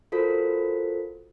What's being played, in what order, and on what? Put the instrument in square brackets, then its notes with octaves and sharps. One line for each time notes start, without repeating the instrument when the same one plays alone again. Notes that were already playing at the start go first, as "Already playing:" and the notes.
[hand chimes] F4 F#4 A4 A#4 C5 B6